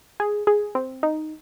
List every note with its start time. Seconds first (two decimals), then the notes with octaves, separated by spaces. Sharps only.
0.20 G#4
0.47 G#4
0.75 C4
1.03 D#4